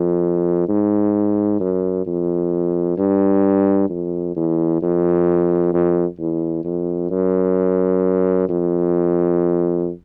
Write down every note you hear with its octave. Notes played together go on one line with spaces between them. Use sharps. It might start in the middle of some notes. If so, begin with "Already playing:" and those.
Already playing: F2
G#2
F#2
F2
G2
F2
E2
F2
F2
E2
F2
F#2
F2